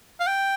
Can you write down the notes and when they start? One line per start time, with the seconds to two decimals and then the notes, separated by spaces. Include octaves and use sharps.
0.20 F5
0.27 G5